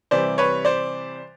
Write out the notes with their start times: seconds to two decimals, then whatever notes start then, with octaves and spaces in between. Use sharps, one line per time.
0.11 C3 E3 G3 C5 D5
0.38 B4 C#5
0.65 C5 D5